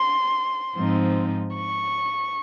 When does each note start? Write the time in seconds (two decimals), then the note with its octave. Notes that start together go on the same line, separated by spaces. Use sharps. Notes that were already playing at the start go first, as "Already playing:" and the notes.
Already playing: C6
0.75 G#2 F3 C4 D#4
1.54 C#6